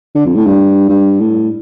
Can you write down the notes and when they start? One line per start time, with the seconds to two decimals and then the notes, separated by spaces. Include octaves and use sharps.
0.15 D3
0.26 F2
0.35 A2
0.46 G2
0.89 G2
1.20 A2